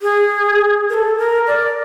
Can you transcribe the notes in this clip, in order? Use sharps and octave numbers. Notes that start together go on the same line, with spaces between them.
G#4
A#4
A4
A#4
D5